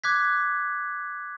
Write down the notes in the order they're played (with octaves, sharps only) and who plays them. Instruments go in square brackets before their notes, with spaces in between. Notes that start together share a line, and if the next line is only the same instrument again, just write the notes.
[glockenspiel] D6 F#6 G#6 B6